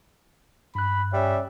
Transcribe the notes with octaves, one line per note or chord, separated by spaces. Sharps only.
G2 B5 F#6
G3 C#4 E5